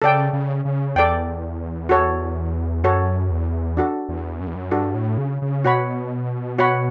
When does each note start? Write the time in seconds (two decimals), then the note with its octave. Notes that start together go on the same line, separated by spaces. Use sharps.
0.02 C#3 A4 D5 G5
0.33 C#3
0.65 C#3
0.96 E2 A4 D5 G5
1.89 F#4 A4 C#5
2.84 F#2 F#4 A4 C#5
3.31 E2
3.77 D4 F#4 A4
4.09 E2
4.40 F#2
4.47 E2
4.55 F#2
4.71 G2 D4 F#4 A4
4.95 A2
5.18 C#3
5.42 C#3
5.64 B2 F#4 C#5 F#5 B5
6.59 F#4 C#5 F#5 B5